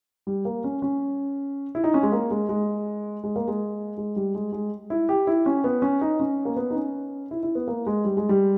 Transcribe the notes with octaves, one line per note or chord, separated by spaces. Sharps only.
G3
A#3
C#4
C#4
E4
D#4
C#4
G#3
A#3
G#3
G#3
G#3
A#3
G#3
G#3
G3
G#3
G#3
E4
G4
E4
C#4
B3
C#4
D#4
C#4
A#3
B3
D#4
C#4
E4
E4
B3
A#3
G#3
G3
G#3
G3